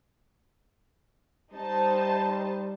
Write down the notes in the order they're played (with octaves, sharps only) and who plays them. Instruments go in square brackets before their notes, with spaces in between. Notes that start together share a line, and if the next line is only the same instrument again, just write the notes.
[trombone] G3 [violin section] D#4 C5 A5